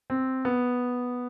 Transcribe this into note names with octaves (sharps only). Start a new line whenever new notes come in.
C4
B3